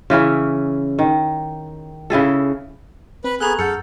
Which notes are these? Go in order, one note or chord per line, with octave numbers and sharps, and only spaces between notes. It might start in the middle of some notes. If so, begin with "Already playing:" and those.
C#3 E3 C#4 E4
D#3
C#3 E4 G#4 A4
C4 B4
B3 G#4 A4 A#5 C#6 F#6
F#2 G#4 A4 F#5 F6 G6 C#7